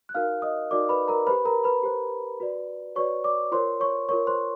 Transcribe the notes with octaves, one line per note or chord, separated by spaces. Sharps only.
F#6
D#4 F#4 A#4 F5 F6
D#5 D#6
D#4 F#4 A#4 D5 D6
B4 B5
A#4 A#5
G4 B4 C5 B5
A#4 A#5
B4 B5
G4 C5
F#4 B4 D5
F#4 B4 C#5 D5 C#6
D5 D6
F4 A#4 C5 C#5 C6
C#5 C#6
F4 A#4 C#5 C#6
C5 C6